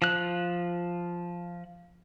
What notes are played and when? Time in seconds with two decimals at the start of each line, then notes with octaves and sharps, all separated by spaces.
0.02 F3 F#6